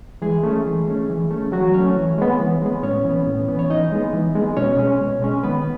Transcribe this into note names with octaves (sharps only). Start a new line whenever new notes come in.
E3 G#3 G#4
A3 C#4
E3
A3 C#4
E3
A3 C#4
E3 F#3 F#4
A3 C#4 C#5
E3
G#3 B3
E3
G#3 B3
A2 C#4 C#5
E3 B3
A2
E3 B3
C#5
E3 D#4 D#5
G#3 B3
E3
G#3 B3
B2 C#4 C#5
G#3 C#4
B2
G#3 C#4
D#3 B3 B4